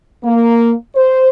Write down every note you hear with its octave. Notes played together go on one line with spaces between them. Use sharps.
A#3
C5